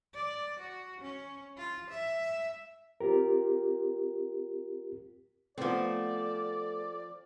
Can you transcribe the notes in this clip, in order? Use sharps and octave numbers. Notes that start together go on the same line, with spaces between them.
D5
F#4
C#4
F4
E5
C4 F4 G4 A#4
F3 A3 B3 C4 D5